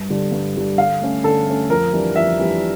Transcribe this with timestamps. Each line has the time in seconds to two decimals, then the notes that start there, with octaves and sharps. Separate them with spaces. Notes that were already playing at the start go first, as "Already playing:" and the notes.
Already playing: G2
0.10 D3 G3 D4
0.32 G2
0.56 D3 G3 D4
0.78 D3 F5
1.01 A3 C#4
1.24 D3 A4
1.47 A3 C#4
1.70 F2 A#4
1.93 E3 G3 D4
2.16 F2 E5
2.39 E3 G3 D4